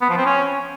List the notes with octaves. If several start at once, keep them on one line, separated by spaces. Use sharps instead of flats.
B3
F3
C4
C#4